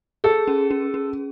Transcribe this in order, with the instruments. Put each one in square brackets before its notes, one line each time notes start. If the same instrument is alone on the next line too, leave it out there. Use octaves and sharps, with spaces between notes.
[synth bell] G#4 [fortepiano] A4
[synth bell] C#4
C#4
C#4